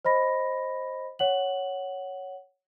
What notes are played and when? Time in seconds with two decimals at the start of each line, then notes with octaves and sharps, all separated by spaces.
0.05 C5 D#5 B5 A#6
1.19 C#5 F#5 F#7